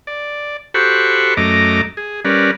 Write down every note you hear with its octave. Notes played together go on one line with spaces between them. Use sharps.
D5
F#4 G4 A4 C5 B5 C#6
F#2 A3 D#5 A#5 D6
G#4
G3 C#4 A#4 B4 D5